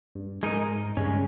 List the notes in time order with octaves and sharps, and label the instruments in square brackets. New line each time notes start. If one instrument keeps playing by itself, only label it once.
[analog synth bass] G2
[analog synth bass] G#2 [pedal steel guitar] G#3 D#4 A#4 D#5
[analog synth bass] G2 [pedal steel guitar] C#3 G#3 C#4